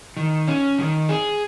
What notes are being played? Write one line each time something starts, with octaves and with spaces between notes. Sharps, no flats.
D#3
C#4
D#3
G#4